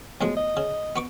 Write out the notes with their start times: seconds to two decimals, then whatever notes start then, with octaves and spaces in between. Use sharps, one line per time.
0.21 B1 A2 F3 G#3
0.36 D#5
0.57 C#3
0.96 B3 C#6 D6